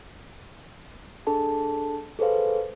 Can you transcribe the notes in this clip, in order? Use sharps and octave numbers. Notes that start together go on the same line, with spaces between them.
D4 G#4 A4 A5
G#4 A4 B4 C5 F5